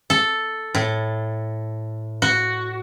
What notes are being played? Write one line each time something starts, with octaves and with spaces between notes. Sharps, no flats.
A4
A2
F#4